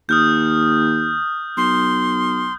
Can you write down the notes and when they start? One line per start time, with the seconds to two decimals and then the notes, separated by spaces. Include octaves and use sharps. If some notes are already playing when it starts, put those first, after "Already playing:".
0.09 D#2 D#6 F6 G6
1.57 B1 C6